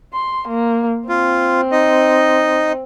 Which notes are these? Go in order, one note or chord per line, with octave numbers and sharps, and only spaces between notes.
C6
A#3
C4 F4
D#4 D#5